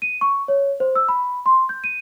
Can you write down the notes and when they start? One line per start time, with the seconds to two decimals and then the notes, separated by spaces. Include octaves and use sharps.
0.02 D#7
0.21 C#6
0.48 C#5
0.80 C5
0.95 E6
1.09 B5
1.46 C6
1.69 G6
1.84 D#7